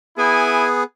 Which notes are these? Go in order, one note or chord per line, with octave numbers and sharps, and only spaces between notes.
B3 E4 G#4 G#5